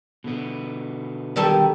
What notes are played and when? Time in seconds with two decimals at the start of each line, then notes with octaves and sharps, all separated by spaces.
0.24 B2 D3 B3
1.36 D#3 G3 A4